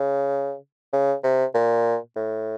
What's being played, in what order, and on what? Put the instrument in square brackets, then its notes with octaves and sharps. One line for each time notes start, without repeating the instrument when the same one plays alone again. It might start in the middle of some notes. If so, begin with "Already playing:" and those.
Already playing: [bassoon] C#3
C#3
C3
A#2
A2